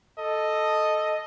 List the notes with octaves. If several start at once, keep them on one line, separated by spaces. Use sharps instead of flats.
A4 D#5